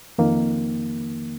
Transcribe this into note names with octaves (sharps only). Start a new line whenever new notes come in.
F2 D#3 A#3